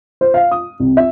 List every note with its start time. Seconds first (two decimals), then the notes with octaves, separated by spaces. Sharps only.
0.21 C5
0.34 F5
0.51 D#6
0.80 C2
0.97 E5